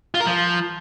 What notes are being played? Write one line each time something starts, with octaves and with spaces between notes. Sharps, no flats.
F4
A#4
F3